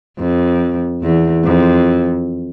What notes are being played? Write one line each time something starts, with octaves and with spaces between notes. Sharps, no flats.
F2
E2
F2